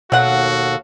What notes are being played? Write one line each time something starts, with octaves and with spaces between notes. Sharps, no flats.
D#2 B2 F#3 F#4 A4 F5 F#5